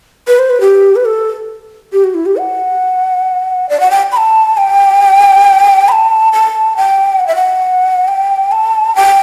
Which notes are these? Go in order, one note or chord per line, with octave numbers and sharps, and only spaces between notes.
B4
C5
B4
G4
B4
A4
G4
F#4
E4
G4
F#5
D5
F#5
G5
B5
A5
G5
B5
A5
A5
G5
F#5
E5
F#5
G5
A5
G5